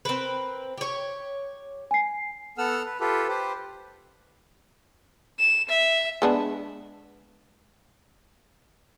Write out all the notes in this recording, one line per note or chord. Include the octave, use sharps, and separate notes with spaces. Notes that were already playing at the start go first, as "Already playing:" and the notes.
C4 A#4 B4
G4 C#5
G#5 C7
B3 A4 F#5 E6 F6
B4
F4 G4 A4 B4
G4 B4 C5
E7
E5
G#3 B3 D4